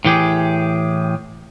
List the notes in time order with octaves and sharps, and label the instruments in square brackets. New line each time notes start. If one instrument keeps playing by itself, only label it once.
[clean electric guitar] A2 E3 G4 G#4